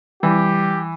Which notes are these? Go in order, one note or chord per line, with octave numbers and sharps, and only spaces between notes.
E3 G3 G4